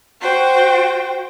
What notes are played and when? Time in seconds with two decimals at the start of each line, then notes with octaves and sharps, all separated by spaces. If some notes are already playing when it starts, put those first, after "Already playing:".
0.21 F#4 C5 G5